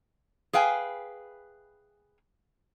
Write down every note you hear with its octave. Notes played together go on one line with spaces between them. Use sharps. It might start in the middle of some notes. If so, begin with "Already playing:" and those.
G#4 B4 F5 G5 G#5